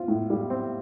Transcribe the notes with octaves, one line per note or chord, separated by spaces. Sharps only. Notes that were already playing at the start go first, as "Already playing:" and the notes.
Already playing: C4 F4
A2
G3
C4